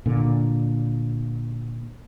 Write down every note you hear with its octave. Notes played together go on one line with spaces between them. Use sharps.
A#2 D3